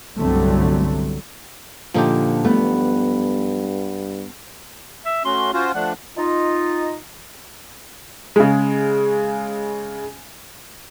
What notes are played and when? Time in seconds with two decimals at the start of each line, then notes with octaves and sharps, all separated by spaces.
0.18 G1 C2 D3 F#3 A3 C4
1.94 A#2 D3 F3 D#4 G4 A4
2.44 G2 A3 B3
5.06 E5
5.25 A3 C#4 F#4 C6
5.53 C#4 F4 F#4 C5
5.74 F3 A3 D4 F#5
6.18 D#4 F4 D#5
8.36 C#3 G#3